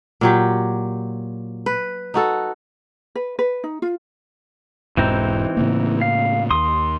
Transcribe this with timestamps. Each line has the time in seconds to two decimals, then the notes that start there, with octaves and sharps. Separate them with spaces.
0.21 A#2 F#3 G4
1.66 B4
2.14 D#4 F#4 A4
3.15 B4
3.39 B4
3.64 D#4
3.82 F4
4.97 E1 G#2 E3 C4 D#4
5.57 A2 C#3 A#3
6.01 F5
6.51 D#2 C6 D#6